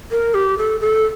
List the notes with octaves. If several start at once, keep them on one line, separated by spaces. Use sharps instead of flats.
A#4
G4
A4
A4